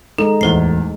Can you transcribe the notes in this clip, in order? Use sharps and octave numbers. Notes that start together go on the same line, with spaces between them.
G#3 D#4 A4
D1 E2 C5 C7